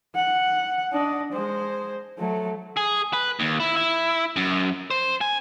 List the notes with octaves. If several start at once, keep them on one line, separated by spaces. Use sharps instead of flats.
F#5
D4 D#5
G#3 C5
F#3 A3
G#4
B4
D#2
E4
E4
F#2
C5
G#5